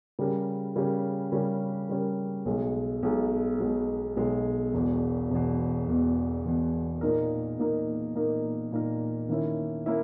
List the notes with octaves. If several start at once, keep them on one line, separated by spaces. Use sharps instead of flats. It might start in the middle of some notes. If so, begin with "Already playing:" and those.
C#3 G3 C#4 G4 A#4
C#3 G3 C#4 G4 A#4
C#3 G3 C#4 G4 A#4
C#3 G3 C#4 G4 A#4
B1 B2 G#3
B1 B2 G#3
B1 B2 G#3
B1 B2 G#3
E1 E2 B2
E1 E2 B2
E1 E2 B2
E1 E2 B2
A#2 A#3 D#4 A#4
A#2 A#3 D#4 A#4
A#2 A#3 D#4 A#4
A#2 A#3 D#4 A#4
D#3 A#3 C#4 E4
A#3 C#4 E4